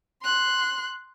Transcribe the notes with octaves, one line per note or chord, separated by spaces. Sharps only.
C6 F#6